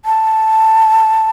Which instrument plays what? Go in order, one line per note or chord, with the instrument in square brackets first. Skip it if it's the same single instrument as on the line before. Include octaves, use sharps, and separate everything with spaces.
[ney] A5